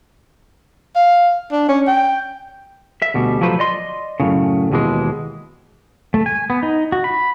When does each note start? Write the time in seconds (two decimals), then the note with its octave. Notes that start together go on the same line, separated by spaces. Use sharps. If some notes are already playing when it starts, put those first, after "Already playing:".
0.96 F5
1.52 D4
1.68 C#4
1.87 G5
3.02 E5
3.14 D2 B2 G3
3.41 F3 F#3 A3 B4 C5
3.59 D5 D#5 C6
4.20 F#2 A2 C#3
4.71 D#2 B2 E3 G#3
6.14 A3
6.26 G#5
6.50 B3
6.63 D#4
6.92 F#4
7.04 B5